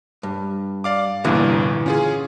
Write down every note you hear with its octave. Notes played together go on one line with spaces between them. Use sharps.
G2
D5 F5 D6
G1 C2 G2 A#2 D3 E3
C#4 F4 G#4